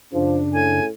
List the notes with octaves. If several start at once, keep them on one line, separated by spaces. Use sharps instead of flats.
F#2 C#3 F3 D4
A2 G#5